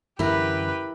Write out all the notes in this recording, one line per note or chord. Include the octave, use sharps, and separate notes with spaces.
F#2 D3 E3 E4 G4 A#4 B4